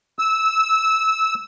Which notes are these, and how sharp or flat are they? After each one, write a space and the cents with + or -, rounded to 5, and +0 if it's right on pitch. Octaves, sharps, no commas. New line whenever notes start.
E6 -15